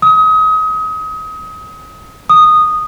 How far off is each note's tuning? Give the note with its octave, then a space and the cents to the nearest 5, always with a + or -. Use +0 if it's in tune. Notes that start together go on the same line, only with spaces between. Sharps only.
D#6 +30
D#6 -10